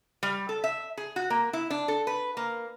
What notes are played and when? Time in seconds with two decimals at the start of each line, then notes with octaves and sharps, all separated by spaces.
0.23 G3
0.49 A4
0.64 E5
0.97 G#4
1.16 F#4
1.30 A#3
1.53 E4
1.70 D4
1.88 A4
2.07 B4
2.37 A#3